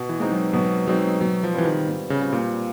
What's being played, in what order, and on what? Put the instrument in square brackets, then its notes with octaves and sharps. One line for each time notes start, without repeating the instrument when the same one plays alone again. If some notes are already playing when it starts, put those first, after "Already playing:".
Already playing: [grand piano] B2
[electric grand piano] E3
[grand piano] G#3 C4 D#4
[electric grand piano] F#3
[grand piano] B2 [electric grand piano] F#3
[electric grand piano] F#3 [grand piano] G#3 C4 D#4
[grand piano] B2 [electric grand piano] F#3
[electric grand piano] F3
[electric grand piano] E3 [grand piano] G3 C4 F4
[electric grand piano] D#3
[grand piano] B2
[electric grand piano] C#3
[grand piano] G3 C4 F4
[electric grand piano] A#2